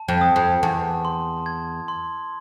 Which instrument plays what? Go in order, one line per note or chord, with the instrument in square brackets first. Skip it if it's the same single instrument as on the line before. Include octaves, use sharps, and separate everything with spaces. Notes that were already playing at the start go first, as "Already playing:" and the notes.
Already playing: [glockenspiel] A5
[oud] F2
[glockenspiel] D#6
[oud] F2
[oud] E2 [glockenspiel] A5
[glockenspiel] C6
G#6
C6